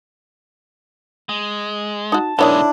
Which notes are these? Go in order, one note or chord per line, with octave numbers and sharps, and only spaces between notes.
G#3
D#4 F#4 A5
B1 D#3 G#3 D4 E4 C#5 F#5 A5